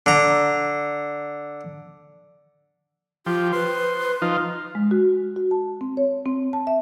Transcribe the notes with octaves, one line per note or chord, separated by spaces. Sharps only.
D3 A#5
F3 F4 G4
B4 C5
F3 D#4 F4
G#3
F#4
F#4
A5
C4
C#5
C4
A5
E5